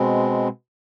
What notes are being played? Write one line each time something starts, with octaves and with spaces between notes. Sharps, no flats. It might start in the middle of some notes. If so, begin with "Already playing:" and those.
Already playing: B2 G#3 C4